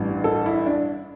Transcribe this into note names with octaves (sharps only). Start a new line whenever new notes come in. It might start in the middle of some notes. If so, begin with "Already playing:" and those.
Already playing: A1 G2 E3
A4
E4
D4